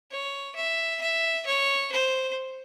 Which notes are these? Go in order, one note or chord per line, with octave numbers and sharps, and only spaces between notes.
C#5
E5
E5
C#5
C5